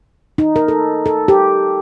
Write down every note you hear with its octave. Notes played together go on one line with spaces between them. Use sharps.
D#4
A#4
A4
A4
G4